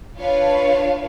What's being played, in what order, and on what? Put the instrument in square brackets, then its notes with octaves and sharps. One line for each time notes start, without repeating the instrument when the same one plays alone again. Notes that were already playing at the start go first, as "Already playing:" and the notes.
[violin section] D4 F4 B4 C#5 F5 A5